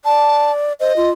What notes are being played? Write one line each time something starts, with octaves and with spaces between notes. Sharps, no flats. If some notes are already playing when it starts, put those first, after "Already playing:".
D5 A5
C5 D#5
F4